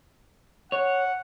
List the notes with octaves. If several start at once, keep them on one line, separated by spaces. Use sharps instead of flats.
C#5 F#5